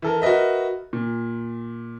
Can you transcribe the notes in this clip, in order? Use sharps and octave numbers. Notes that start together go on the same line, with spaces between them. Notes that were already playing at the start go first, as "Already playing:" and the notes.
E3 A4 A#4
F#4 A#4 B4 D#5 E5
A#2